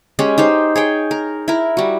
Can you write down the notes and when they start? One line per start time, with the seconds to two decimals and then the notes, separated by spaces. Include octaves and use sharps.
0.19 G#3 C#4 G4
0.38 D#4 G4 C5
0.76 G#4 C#5 G5
1.11 A#4
1.48 E4 A#4
1.77 G3 F#4